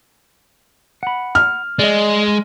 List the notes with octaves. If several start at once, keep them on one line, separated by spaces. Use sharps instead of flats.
F#5 B5
F6
G#3 D5 D#5